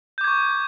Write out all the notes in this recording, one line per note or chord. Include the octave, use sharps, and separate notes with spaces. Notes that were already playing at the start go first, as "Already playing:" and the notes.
C#6 D6 G6 G#6